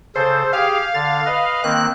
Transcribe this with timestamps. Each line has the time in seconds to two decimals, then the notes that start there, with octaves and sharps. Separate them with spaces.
0.16 C#3 A4 C5
0.53 G4 G#4 F5
0.94 D3 A6
1.26 B4 D#5
1.64 D#3 A#3 C4 F#6